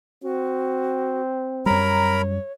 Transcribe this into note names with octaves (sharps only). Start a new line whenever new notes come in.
C4 F#4
F#2 G3 A#4 C#5 A#5 B5